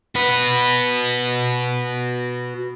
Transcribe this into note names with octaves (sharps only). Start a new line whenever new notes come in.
F#4 B4